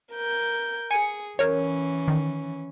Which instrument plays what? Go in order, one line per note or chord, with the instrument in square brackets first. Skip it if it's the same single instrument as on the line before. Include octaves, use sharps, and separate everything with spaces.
[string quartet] A#4 G6
[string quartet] G#4 [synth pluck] G#5 C#7
[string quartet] E3 C#4 [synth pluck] A#4 C#5
[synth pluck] D#3